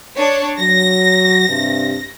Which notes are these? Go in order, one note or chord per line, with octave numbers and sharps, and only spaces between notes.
D4 C#5
F#3 A#6
G2 C3